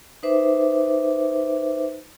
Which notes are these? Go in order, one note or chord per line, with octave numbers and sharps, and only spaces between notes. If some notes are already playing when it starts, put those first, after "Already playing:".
D#4 B4 C5 E5 D6